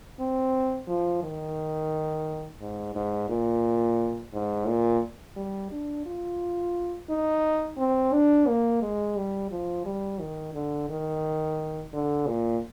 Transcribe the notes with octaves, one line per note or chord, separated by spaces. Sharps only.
C4
F3
D#3
G#2
G#2
A#2
G#2
A#2
G3
D4
F4
D#4
C4
D4
A#3
G#3
G3
F3
G3
D#3
D3
D#3
D3
A#2